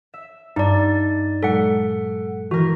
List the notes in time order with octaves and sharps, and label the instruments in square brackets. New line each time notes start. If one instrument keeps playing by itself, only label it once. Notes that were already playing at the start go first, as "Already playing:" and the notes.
[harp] E5
[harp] G2 [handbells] D#4 D5
[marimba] A#2 F#3 G#3 [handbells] A4 F#5
[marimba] D#3 [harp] E3 A#4 [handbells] F#4